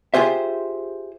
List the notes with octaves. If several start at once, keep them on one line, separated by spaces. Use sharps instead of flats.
F4 G4 G#4 C5 E5